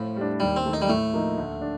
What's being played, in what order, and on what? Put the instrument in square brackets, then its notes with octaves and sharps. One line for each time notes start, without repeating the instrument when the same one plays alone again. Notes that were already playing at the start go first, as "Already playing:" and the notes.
Already playing: [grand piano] A2 [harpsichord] F3
[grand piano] G3
D4
[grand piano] D#2 [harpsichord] G3
[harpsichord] C4
[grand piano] D#3 A3
[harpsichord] D#4
G3
[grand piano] A2 [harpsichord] A3
[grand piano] F3 A#3 D#4
D2
D4